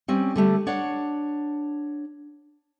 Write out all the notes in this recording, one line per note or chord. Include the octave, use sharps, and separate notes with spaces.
G3 C4 C#4
D3 G3 A3
D4 C#5 F#5